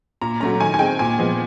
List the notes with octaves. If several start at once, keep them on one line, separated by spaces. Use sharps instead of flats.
A#2 A#5
F#3 A3 C#4 A#5
D#3 G#5
G#5
G#3 C4 G5
A#2 G#5
F3 G#3 B3